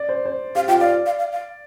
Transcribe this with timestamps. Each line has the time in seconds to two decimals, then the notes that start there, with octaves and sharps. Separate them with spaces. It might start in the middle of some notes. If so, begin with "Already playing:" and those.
Already playing: D5
0.09 C5
0.25 C5
0.55 G4 F5
0.68 F4 G5
0.81 D5 F5
1.06 F5
1.19 F5
1.32 F5